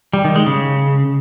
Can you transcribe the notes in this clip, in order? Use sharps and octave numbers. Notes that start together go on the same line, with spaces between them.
G3
D#3
G#3
C#3